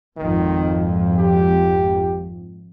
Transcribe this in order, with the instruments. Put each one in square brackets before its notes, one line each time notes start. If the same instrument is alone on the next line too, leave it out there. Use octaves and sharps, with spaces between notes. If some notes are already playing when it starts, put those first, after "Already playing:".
[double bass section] G#1 F2 [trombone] D#3
[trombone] G4